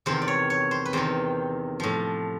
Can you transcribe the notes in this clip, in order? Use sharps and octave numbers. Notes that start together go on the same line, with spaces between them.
E2 C3 D#3 C5
D5
C#5
C#5
C5
B4
E2 C3 D#3 C5
A2 F3